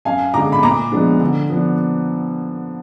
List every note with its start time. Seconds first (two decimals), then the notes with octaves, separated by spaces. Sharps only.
0.05 F#2 F5 G#5
0.34 D3 G#3 A#5 D6
0.52 B5
0.63 A#2 A#5 D6
0.91 F3 G#3 B3 D4
1.20 D3
1.50 F3 B3 D4